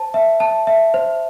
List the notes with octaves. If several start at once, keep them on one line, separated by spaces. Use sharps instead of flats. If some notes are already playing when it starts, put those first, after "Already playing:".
Already playing: C5 A5
E5
A5
E5
C5